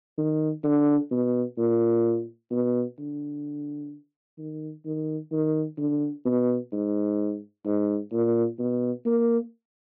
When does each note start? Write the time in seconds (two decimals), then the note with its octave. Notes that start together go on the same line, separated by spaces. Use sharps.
0.18 D#3
0.64 D3
1.11 B2
1.58 A#2
2.51 B2
2.98 D3
4.38 D#3
4.85 D#3
5.32 D#3
5.78 D3
6.25 B2
6.72 G#2
7.66 G#2
8.12 A#2
8.59 B2
9.06 A#3